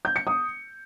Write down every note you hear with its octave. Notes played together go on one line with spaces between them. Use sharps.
G6
C#7
D#6